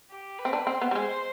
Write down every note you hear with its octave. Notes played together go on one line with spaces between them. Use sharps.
G4
B4
C4
D4
C4 C5
B3
G3
G#3 C5